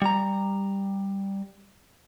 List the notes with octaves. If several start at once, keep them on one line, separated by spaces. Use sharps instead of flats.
G3 A#5